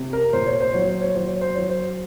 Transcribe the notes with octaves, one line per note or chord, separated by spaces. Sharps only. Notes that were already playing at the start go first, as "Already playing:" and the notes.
Already playing: C3
A#4
A#2 C5
C#5
C5
F#3 C#5
C5
C#5
F#3 C5
C#5
C5
F#3 C#5
C5